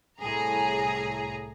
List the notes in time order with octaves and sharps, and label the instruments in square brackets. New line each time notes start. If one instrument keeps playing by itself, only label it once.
[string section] C2 A2 G#4 A#5